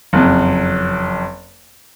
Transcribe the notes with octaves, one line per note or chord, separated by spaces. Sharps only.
F#1 F2